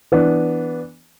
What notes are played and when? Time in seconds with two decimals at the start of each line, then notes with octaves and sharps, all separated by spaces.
0.12 E3 B3 D4